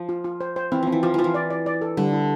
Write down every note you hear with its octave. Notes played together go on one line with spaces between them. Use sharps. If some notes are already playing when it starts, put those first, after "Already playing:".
Already playing: F3
F4
F4
C5
C5
E3 C4
F3 C4
E3
F3 F4
E3 F3 F4
E3
D5
D5
D5
A4
D3 G3
E4